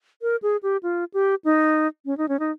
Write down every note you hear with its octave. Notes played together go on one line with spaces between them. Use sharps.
A#4
G#4
G4
F4
G4
D#4
C#4
D#4
C#4
D#4